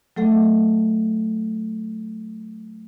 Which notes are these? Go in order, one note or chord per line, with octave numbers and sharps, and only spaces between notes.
F#3 A3 A4 F#5